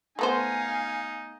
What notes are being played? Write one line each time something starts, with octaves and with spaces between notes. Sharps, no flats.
A3 B3 D#4 C5 F5 G#5